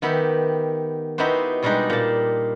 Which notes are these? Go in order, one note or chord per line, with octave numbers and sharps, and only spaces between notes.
D#3 B3 G4 E5 B5
B3 D#4 E4 F#4 G4 C5
B2 G3 G#3 D4 D#4 G4
A#2 A5